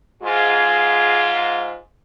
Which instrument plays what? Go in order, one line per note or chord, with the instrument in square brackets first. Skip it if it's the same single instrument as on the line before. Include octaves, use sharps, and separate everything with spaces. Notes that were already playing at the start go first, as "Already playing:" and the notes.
[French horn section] G#2 F4 [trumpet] G#4